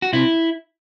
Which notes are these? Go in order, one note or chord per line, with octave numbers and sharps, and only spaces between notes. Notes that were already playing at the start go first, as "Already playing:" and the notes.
F#4
C3 E4